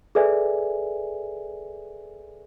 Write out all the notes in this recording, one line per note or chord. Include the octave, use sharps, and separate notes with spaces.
G#4 A4 B4 D5 E5 G#5